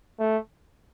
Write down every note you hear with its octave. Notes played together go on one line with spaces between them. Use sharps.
A3